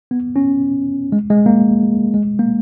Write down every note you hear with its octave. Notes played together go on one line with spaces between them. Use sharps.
B3
C#4
G#3
G#3
A#3
G#3
A#3